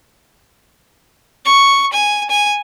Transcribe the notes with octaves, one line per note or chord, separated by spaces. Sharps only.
C#6
G#5
G#5